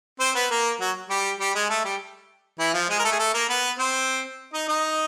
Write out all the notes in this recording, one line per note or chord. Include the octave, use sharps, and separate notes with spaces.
C4 C5
B3 B4
A#3 A#4
F#3 F#4
G3 G4
G3 G4
G#3 G#4
A3 A4
G3 G4
E3 E4
F3 F4
G#3 G#4
A#4
A3 A4
G#4
A3 A4
A#3 A#4
B3 B4
C4 C5
D#4 D#5
D#4 D#5